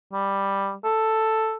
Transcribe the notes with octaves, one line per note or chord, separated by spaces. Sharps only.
G3
A4